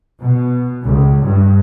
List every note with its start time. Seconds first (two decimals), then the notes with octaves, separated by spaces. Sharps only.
0.22 B2
0.82 C#2
1.23 G2